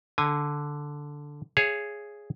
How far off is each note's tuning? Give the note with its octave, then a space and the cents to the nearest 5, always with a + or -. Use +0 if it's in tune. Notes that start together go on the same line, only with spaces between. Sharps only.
D3 +0 G#5 -15
G#4 +0 C#5 +0 F5 -45